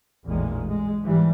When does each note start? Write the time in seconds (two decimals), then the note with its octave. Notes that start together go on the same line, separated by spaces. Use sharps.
0.25 A1 E2 A#2 D#3 G#3
0.68 G#3
1.02 G#2 E3 G3